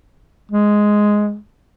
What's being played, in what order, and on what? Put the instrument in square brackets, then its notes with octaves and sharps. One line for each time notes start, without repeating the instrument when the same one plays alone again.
[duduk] G#3